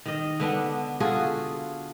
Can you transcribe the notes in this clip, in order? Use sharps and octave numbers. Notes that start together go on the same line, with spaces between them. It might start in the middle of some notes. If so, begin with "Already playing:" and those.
D#3 D#5
D3 B3 D4
F4 F#4 G#4 A4